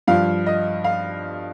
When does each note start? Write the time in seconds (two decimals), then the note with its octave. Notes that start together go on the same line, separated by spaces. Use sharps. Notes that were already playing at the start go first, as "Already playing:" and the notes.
0.07 G2 F3 F5
0.46 D#5
0.84 F5